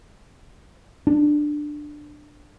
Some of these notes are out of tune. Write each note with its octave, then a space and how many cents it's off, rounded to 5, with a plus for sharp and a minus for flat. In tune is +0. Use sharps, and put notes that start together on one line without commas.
D4 +15